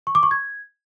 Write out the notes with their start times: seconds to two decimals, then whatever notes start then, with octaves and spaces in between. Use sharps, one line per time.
0.07 C#6
0.15 D6
0.23 C#6
0.31 G#6